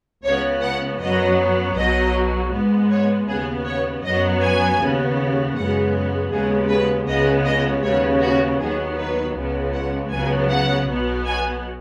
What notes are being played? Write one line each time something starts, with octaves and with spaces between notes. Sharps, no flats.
C#2 C#3 B3 C#5
F#5
F#2 F#3 B3 D#5
B1 B2 F#3 D#5
G#2 G#3 B3
C#5
D#2 C#3 B3 G#4
C#5
F#2 F#3 B3 D#5
G#5
D#2 C#3 B3
F#2 C#3 G#3 B3 F#5
D#2 C#3 G#3 B3 G#4
B4
C#2 C#3 G#3 B3 D#5
D#5
D#2 C#3 B3 C#5
F#4
D#2 D#3 F#3 B3 G#4
B4
C#2 C#3 G#3 B3
F#5
C#2 C#3 F#3 B3 G#5
F#5
B1 B2 B3
G#5